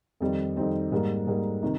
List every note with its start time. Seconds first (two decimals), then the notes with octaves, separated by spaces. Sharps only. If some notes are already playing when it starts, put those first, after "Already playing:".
0.20 F2 D#3 G3 C4 D#4
0.56 F2 D#3 G3 C4 D#4
0.92 G#2 G3 A#3
1.27 G#2 G3 A#3
1.63 C3 D#3